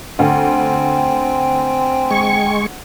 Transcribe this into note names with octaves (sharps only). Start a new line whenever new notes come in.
D2 C4 G5 G#5
G#3 C#6